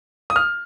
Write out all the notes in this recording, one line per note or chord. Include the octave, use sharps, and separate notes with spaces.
D#6
F6